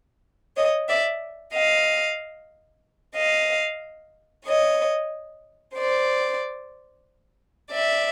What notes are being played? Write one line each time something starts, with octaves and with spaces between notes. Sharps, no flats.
C#5 D#5
D5 E5
D#5 F5
D#5 F5
C#5 D#5
C5 D5
D5 E5